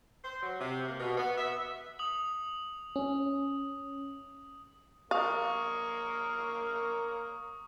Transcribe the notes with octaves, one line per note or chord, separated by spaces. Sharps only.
C5
F#3
C3
A#3
B2
B3
E5
D#6 F#7
C#4
A#3 A#4 C#5 F5 C#6 D#6